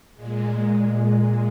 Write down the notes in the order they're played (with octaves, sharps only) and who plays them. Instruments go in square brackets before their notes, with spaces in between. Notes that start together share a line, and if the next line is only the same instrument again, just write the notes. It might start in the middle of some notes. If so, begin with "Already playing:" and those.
[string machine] A#2 G#3